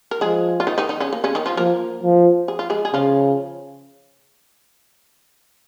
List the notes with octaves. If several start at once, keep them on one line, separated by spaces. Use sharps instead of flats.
A#4
F3 G#3 G#4
F4
D#3 D#4
D#3 D#4
D#3 D#4
C#3 C#4
A#3
C#3 C#4
D#3 D#4
F3 F4
F3 A#3 A#4
F3
G#4
F4
G#3 G#4
G#4
C#3 F3 F4